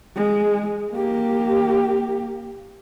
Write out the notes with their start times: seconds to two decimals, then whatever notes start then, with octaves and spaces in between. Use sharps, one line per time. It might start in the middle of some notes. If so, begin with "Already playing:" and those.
0.16 G#3
0.92 A#3 G4